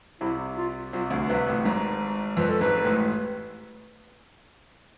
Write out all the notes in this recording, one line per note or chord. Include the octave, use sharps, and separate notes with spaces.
C2 C3 E4
F4
C2 C3 F4
D2 D3
C2 C3 B4
A1 A2
G#1 G#2
F2 B4
A4
G#1 G#2 B4
A1 A2